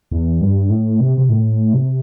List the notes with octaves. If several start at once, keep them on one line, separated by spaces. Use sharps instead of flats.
E2
G2
A2
C3
C3
A2
C3